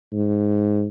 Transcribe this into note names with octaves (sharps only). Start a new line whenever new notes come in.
G#2